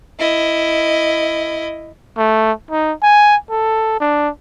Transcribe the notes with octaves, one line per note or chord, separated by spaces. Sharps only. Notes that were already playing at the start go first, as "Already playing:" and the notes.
E4 D#5
A3
D#4
G#5
A4
D4